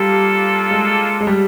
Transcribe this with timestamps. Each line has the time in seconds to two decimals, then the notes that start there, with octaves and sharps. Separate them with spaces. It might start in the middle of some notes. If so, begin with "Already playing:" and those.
Already playing: G3 A#3 D4 F4 A4
0.71 G#3
1.21 G#3
1.27 G3